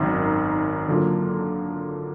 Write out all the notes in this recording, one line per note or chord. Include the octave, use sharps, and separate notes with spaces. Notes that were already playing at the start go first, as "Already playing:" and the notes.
Already playing: G#1 F#2 D#3
D3 F#3 A#3 F4